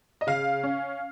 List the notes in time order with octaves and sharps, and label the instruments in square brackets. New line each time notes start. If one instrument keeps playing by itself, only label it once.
[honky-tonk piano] D#5
C#3 F5
C#4